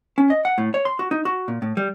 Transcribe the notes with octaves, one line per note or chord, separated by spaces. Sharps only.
C#4
D#5
F#5
A2
C#5
C6
F#4
D#4
F#4
A#2
A2
G3